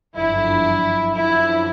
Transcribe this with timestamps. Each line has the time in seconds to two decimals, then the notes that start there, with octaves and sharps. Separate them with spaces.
0.15 G1 F#2 D3 F3 E4
1.14 F#2 D3 F3 E4